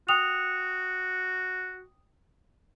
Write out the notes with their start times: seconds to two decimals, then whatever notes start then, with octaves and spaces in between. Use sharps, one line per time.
0.09 F#4 G5 D#6 F7